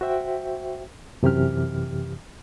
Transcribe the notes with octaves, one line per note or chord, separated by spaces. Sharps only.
F#4 C5 E5 G5
F#2 C3 E3 G4 F6